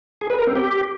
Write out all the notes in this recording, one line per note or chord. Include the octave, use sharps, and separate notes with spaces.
G#4
B4
A#4
C4
G4